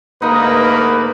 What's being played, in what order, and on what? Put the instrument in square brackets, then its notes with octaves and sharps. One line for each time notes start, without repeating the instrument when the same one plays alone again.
[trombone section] D2 G#2 A#3 [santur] D#4 D#6 [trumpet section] A#4 B4